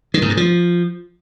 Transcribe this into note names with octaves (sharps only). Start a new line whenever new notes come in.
D#3
G#2
G2
F3